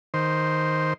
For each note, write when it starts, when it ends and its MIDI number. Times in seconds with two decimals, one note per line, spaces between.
0.14 0.93 51
0.14 0.93 72